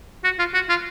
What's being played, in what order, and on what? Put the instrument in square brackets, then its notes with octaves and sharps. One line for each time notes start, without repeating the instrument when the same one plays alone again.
[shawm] F#4
F4
F#4
F4